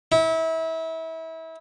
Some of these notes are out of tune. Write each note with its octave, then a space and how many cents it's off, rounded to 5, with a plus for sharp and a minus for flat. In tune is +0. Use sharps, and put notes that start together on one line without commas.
E4 -30